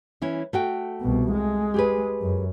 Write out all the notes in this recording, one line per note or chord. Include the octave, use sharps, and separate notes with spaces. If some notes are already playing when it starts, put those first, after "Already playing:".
E3 C#4 E4
A3 F#4 G5
C2 B2
G#3
G4 G#4 B4
F#2